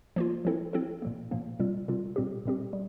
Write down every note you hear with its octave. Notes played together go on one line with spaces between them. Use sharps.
F3 A#3 F4
F3 C4 E4 A4
F3 C4 E4 A4
A#2 F3 A#3
A#2 F3 A#3
C3 G3 C4 F4
C3 G3 C4 F4
A#2 G3 C4 G4
A#2 G3 C4 G4
G3